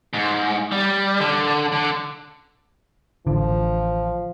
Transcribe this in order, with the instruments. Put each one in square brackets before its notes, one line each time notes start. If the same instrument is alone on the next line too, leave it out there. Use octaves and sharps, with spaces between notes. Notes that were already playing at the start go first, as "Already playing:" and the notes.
[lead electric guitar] G#2
G3
D3
D3
[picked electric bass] A1 D3 [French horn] F3